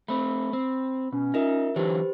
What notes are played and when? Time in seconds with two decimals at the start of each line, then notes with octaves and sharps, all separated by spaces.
0.08 A3 C4 B5
0.53 C4
1.12 B2 C#4
1.34 D#4 F4 A#4 E5
1.76 D3 E3 F#3 G4 B4 C5